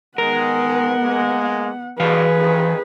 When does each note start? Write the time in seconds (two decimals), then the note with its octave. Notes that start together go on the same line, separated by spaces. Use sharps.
0.18 D#3 G#3 B3 A#4 F#5
1.02 G#3 A#3
2.00 G2 B2 E3 G#4 B4 F5
2.38 A1 F2 D#3